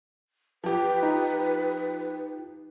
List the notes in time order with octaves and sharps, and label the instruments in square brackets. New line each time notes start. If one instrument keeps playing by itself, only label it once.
[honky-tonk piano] F3 G4 [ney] B4
[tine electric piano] D#4